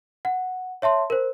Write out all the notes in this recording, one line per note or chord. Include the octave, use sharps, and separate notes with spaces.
F#5
C#5 E5 A5 C6
A#4 C5